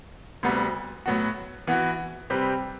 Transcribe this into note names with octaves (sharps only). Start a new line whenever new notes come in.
D2 C3 G3 B3 F#4
A2 F#3 B3 F#4
E3 B3 F#4
C3 G3 C4 G4 B4